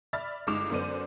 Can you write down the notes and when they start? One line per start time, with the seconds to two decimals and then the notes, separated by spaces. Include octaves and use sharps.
0.13 D5 E5 B5 F6 A6
0.47 G1 G#3 D#4 D6 E7 F7
0.70 F#2 D3 B3 C5 D5 D#7